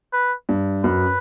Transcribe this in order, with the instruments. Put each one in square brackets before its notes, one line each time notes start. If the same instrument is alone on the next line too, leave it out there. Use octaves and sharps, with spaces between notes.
[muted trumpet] B4
[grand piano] G2
[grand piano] F#2 [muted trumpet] B4